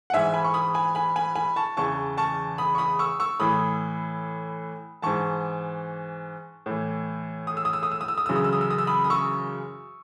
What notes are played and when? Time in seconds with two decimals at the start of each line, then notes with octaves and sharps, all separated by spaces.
0.10 F#5
0.14 G#2 E3 E5 G#5
0.34 G#5 B5
0.44 C#6
0.54 B5 D#6
0.74 G#5 B5
0.95 G#5 B5
1.16 G#5 B5
1.35 G#5 B5
1.56 A5 C#6
1.77 E2 C#3 E3 A5 C#6
2.18 A5 C#6
2.58 B5 D#6
2.75 C#6
2.78 B5 D#6
2.99 C#6 E6
3.20 C#6 E6
3.40 A2 E3 B5 D#6
5.02 G#2 E3 A5 C#6
6.66 A2 E3
7.47 D#6
7.57 E6
7.65 D#6
7.73 E6
7.83 D#6
7.92 E6
8.01 D#6
8.08 E6
8.18 D#6
8.26 F#2 C#3 E3 E6
8.36 D#6
8.44 E6
8.53 D#6
8.61 E6
8.70 D#6
8.78 E6
8.87 B5 D#6
9.04 D#6
9.10 C#6 E6